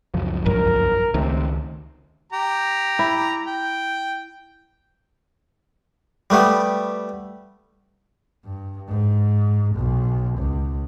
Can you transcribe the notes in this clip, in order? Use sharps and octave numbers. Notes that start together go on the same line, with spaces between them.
C#2 F#2 F3
A#1 G2 F#3 A#4
C#2 C3 D#3 A3
G4 A#5
E4
G5
G3 A3 B3 G4
G2
G#2
B1
C#2